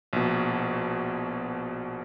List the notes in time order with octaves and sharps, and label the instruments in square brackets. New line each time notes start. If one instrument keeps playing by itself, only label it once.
[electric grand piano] A#1 B2